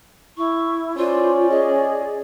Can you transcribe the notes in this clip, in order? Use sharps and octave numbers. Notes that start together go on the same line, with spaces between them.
E4 C#6
C#4 F4 C5 D5
G#4 D#5